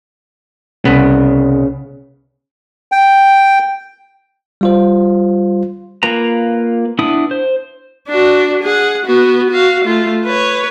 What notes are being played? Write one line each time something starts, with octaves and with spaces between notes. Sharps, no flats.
C2 C#3 B3
G5
G3 F4 C5
A#3 F4 B4 A#5
B3 D4 E4 D#6
C5
D4 F#4
G#4 F#5
B3 F#4
F#4 F5
A3 F4
B4 C#5